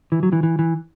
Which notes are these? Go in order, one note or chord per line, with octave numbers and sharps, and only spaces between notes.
E3
F#3
E3
E3
E3